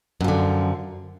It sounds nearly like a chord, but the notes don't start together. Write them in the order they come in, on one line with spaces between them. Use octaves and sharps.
F#2 F3 D3